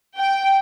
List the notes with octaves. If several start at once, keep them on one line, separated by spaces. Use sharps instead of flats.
G5